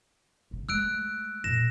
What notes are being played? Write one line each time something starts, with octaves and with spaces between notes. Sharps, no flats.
G#1 C#3
G#3 A3 E6 F#6 D7
F#2 A#2 A#6 E7